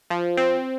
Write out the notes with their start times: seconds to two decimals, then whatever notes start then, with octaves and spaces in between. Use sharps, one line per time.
0.10 F3
0.37 C4